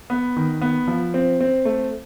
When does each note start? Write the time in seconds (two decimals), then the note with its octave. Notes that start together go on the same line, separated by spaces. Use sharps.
0.10 B3
0.36 D#3
0.62 B3
0.88 F3
1.14 C4
1.40 C4
1.65 A3